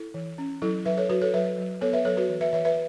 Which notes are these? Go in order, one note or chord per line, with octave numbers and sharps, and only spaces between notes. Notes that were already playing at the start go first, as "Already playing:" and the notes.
Already playing: E4 A4
E3
C#4
F#3 E4 A4
F#3 B4 E5
A4 C#5
F#3 F#4 B4
A4 C#5
F#3 B4 E5
F#3
B3 A4 C#5
B4 E5
F#3 A4 C#5
F#4 B4
E3
B4 E5
E3 B4 E5
B4 E5